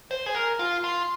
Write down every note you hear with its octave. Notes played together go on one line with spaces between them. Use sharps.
C5
G#4
A#4
F4
F4